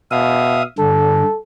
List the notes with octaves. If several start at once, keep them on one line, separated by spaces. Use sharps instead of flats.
B2 E5 F5 D#6
G2 D3 A4